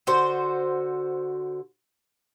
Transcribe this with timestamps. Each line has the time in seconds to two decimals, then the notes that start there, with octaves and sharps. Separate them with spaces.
0.07 D3 F#4 C5